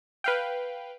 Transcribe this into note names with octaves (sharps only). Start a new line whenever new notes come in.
B4 F5 G5